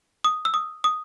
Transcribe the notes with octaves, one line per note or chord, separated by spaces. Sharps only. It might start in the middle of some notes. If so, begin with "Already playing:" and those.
D#6
E6
D#6
D#6